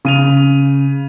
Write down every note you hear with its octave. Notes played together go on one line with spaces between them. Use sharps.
C#3 D#7 F7